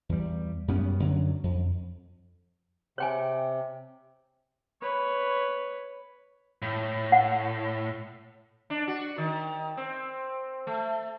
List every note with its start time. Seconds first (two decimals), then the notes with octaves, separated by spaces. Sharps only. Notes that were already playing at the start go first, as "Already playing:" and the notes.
0.09 E2 G3
0.68 F#2 G3 B3 C#4
1.00 F#2 D3 F#3
1.44 F2
2.98 C3 C#5 G5 G#5
4.81 B4 C#5
6.62 A2
7.12 F#5
8.70 D4
8.88 F#4
9.18 D#3
9.77 C4
10.67 A3